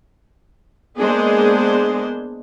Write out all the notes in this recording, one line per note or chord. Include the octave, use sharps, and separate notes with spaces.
G#3 A#3 B3 D4 G#4 C5